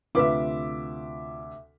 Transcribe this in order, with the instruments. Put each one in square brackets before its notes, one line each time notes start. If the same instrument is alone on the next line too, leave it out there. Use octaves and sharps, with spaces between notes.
[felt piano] D2 C3 [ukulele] F4 B4 [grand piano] E5 D6